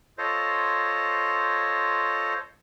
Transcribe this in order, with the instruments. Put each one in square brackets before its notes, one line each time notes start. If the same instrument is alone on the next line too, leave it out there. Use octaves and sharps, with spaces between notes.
[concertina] F4 A4 C5 C#5 D#5